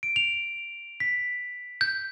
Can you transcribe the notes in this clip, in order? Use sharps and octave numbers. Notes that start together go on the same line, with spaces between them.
D7
F7
B6
G6